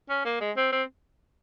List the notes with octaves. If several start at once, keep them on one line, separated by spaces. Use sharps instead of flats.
C#4
A#3
G#3
C4
C4